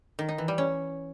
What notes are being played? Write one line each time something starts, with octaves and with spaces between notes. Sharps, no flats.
D#3
D#4
E3
G3
C#4